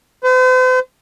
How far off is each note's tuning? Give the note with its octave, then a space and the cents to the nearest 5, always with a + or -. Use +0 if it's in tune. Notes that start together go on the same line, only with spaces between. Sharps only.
C5 -45